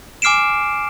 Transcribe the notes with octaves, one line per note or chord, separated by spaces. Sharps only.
G#5 D6 F6 C7 D7 E7